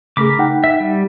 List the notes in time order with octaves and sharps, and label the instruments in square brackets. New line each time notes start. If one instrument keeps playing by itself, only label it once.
[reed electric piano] C#3 A3 G#4 [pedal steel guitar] A#4 B5 D6
[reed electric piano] D#4 F#5 G5
[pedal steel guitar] E5
G3